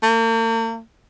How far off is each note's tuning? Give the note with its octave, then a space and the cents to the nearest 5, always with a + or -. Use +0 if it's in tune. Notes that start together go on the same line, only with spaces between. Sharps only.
A#3 -45